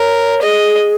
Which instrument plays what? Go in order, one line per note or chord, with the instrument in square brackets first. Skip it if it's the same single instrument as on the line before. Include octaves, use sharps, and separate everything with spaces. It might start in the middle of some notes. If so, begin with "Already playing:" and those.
Already playing: [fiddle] A#4 [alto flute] C#5
[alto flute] G#4 [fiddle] D#5